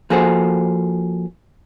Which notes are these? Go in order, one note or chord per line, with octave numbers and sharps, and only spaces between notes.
F3 A#3 F#4 G#4 A4 C5